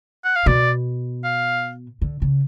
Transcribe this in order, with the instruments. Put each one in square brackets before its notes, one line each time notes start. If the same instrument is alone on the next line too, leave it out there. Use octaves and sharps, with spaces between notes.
[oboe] F#5
F5
[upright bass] B2 [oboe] D5
[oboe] F5
[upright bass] D3
C#3